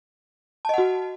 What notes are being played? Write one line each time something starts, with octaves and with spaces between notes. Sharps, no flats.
F#4 D#5 F#5 A5